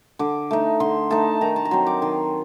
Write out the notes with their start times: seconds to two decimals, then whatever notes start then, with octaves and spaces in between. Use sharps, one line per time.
0.19 D3 D6
0.51 A3 D#4
0.80 D3 C6
1.10 A3 D#4 A5
1.41 D#3 A#5
1.56 A5
1.65 A#5
1.71 F#3 C4 C6
1.87 D6
2.02 D#3 C6